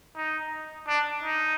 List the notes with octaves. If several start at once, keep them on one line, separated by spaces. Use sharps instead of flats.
D#4
D4
D#4